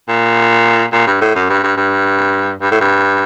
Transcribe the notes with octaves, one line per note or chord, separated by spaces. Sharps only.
A#2
A#2
G2
A2
F#2
G2
G2
G2
G2
A2
G2